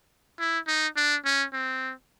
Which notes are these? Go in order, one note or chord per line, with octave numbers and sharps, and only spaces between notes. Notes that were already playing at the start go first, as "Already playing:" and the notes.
E4
D#4
D4
C#4
C4